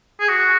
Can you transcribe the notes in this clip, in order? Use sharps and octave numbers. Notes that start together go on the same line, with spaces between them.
G#4
F#4